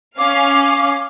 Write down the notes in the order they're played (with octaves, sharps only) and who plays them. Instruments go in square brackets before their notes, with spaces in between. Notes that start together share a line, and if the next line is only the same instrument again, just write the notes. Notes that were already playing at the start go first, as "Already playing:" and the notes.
[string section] C#4 F5 [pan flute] D6